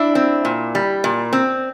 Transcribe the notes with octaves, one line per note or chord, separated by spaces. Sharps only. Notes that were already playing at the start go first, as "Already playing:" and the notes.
Already playing: D4 E4
C4
A#2
G3
A#2
C4